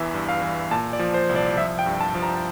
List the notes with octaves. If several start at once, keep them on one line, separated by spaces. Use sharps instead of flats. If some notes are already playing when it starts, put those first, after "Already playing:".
Already playing: E2 E3 E5
G2
F5
E3
A#2 A5
D5
F3
C5
C2
D5
F3 E5
G5
G2
A5
F3
A#5